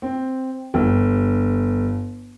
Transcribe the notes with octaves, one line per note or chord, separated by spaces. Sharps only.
C4
G1